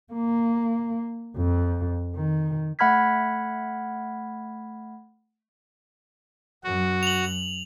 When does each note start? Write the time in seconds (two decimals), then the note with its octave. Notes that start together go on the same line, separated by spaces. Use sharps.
0.13 A#3
1.36 F2
2.16 D#3
2.79 A3 F#5 B5 F6 G#6 B6
6.64 F#2 F#4
7.03 F7 F#7